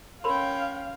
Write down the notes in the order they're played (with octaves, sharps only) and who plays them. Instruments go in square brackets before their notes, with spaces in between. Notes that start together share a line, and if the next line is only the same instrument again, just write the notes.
[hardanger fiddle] C#4 G5 [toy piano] A#4 B5 C6 [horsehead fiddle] F5